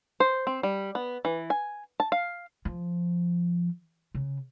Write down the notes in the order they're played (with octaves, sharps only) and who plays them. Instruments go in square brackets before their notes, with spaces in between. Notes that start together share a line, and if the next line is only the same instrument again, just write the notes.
[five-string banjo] C5
C4
G3
B3
E3
G#5
A5
F5
[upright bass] F3
C#3